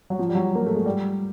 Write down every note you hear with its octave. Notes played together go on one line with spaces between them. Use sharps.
F#3
F3
G3
F#3
A#3
A3
G#3
G3